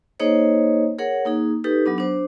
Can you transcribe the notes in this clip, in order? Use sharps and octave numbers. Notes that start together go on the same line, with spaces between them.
A#3 D#4 G#4 C5 C#5 D#5
G#4 A#4 C#5 F#5
A#3 D#4 G#4
D#4 G4 A4 B4
F#3 B3 D4
D4 C5